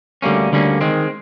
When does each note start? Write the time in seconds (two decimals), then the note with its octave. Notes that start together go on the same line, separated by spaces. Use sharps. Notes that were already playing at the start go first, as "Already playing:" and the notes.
0.22 D2 D3 G3 A#3 C#4
0.52 D2 D3 G3 A#3 C#4
0.81 D#3 G#3 C4